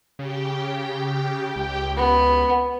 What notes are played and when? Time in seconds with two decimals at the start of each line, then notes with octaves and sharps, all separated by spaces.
0.19 C#3 G4 G5
1.56 C#2
1.96 B3